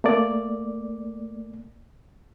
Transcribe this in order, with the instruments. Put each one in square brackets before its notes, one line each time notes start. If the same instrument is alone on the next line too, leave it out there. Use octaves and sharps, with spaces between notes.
[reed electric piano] A3 A#3 D5